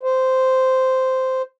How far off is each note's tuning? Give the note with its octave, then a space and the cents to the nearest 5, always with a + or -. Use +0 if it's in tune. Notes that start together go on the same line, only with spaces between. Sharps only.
C5 -10